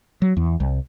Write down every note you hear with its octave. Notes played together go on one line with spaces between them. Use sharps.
F#3
E2
C2